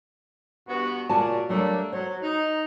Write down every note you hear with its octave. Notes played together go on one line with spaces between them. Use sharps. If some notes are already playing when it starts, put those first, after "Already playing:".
G2 B3 F#4
A#2 C#3 F#4 D5 G#5 A5
F#3 G3 A3 A#3 D4
F#3 C5
D#4